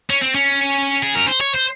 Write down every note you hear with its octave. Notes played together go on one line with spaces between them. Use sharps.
C#4
C4
C#4
G#4
A#4
C5
C#5
C5